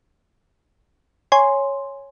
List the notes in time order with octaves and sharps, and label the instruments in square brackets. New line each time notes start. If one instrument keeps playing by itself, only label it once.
[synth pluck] C#5 G#5 C6